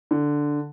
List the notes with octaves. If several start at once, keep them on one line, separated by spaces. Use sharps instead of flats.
D3